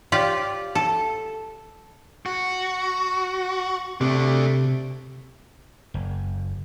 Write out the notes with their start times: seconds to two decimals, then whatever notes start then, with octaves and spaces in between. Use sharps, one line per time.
0.12 F4 G4 D5
0.75 A4
2.26 F#4
4.01 C3 A3 D4
5.94 F#1